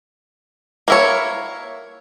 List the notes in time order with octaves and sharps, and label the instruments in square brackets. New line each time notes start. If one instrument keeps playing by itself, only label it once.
[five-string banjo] A#3 E4 C#5